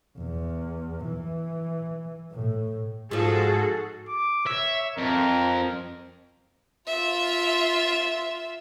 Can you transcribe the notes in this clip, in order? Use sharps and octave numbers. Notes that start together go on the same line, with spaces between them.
E2
E3
A2
G#2 F3 F#4 G#4 A4
D6
C#5 E5
F2 A#4
F4 E5